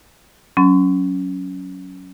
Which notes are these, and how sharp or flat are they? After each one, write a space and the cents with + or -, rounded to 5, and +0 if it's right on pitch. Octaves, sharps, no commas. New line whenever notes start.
F#3 +0 C#4 +5 C6 -40